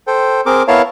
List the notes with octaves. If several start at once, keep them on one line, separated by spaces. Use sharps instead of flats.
A4 C5 G5
C4 G#4 A#4 D6
B3 E4 A#4 C#5 F5 A5